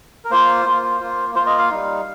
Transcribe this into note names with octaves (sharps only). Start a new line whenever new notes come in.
A#4
A#3 F4 C5
A#3 F4
A#3 F4
A#3 F4 C5
D#5
F5
G3 D#4